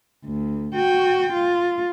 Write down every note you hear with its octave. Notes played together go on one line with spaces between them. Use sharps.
D2
F#4 G5
F4